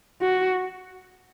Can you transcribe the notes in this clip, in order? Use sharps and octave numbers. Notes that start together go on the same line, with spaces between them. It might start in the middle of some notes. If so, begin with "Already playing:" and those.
F#4